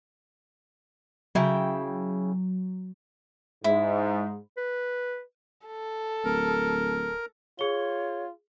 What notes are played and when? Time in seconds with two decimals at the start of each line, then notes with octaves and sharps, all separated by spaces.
1.35 C#3 F#3 E4 G5
3.64 G#2 E4
4.57 B4
5.67 A4
6.24 D1 A#4
7.59 F4 G#4 C#5 G7